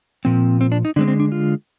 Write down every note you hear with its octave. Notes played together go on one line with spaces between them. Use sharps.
A#2 F3 C4
C4
D4
D#4
D3 G#3 C4 D4
C4
D4
F4